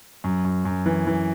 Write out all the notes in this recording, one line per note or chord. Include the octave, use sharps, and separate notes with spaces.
F#2
F#2
F#2
E3
E3